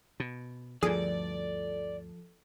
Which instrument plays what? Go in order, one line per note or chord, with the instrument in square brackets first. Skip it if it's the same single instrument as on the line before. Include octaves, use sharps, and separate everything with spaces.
[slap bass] B2
[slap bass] D2 G2 [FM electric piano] F3 A4 [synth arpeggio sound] G#4 [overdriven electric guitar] D5